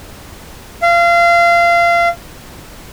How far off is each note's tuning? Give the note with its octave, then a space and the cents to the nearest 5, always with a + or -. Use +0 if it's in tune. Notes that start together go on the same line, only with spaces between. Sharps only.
F5 -25